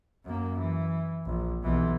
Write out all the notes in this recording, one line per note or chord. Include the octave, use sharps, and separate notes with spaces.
F#2 A#3
E3
A#1
B1 E3